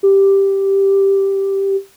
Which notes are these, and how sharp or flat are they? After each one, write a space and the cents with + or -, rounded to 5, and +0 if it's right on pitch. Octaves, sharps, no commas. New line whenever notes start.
G4 +0